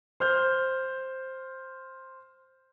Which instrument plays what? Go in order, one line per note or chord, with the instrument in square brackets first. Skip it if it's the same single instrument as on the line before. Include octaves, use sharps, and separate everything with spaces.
[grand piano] C5 F6 G6